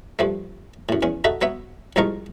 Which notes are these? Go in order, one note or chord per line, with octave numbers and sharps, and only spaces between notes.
G2 F3 A3
F#2 A2
E2 C#4
D#4 F#4 A4 E5
F#3 B3 C#5 E5
C2 G#2 F3 D#4 A#4 C#6